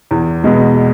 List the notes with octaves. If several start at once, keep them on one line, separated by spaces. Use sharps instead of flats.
E2
B2 G#3